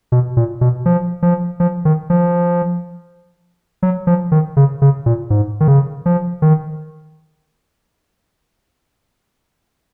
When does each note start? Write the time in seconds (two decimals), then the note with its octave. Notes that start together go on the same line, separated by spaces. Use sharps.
0.12 B2
0.37 A#2
0.61 B2
0.86 F3
1.22 F3
1.60 F3
1.85 D#3
2.10 F3
3.83 F#3
4.07 F3
4.32 D#3
4.57 C#3
4.82 C#3
5.06 A#2
5.30 G#2
5.60 D#3
5.68 C#3
6.06 F3
6.42 D#3